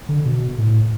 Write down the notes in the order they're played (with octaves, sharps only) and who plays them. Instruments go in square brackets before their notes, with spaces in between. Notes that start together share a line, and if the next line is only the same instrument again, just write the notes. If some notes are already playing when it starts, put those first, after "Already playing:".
[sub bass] D3
B2
A2